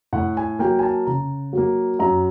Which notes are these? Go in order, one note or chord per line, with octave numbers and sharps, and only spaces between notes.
A2 F#5
G#5
F#3 A#3 G5
G#5
A5
C#3 A#5
F#3 A#3
F#2 A#5